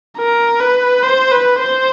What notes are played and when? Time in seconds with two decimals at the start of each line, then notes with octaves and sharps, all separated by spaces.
0.17 A#4
0.60 B4
1.03 C5
1.32 B4
1.60 C5